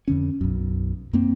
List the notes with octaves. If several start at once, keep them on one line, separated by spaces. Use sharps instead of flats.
F2 D3 C#4
B1 F#2
F#2 A#3 C4